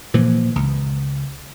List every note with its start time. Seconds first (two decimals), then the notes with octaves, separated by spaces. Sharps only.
0.14 A#2 E3 F3
0.56 C#2